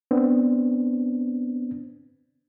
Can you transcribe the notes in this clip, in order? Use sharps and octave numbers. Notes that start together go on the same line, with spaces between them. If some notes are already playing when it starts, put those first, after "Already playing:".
B3 C4 D4